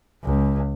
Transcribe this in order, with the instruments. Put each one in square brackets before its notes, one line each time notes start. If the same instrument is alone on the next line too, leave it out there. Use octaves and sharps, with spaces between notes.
[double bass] C#2